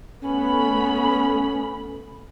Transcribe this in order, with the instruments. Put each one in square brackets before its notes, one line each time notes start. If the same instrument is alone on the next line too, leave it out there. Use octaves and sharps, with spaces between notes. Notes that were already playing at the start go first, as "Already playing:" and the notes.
[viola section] A3 B3 B5 [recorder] C#4